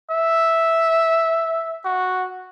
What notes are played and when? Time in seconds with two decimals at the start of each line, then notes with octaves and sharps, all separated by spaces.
0.11 E5
1.85 F#4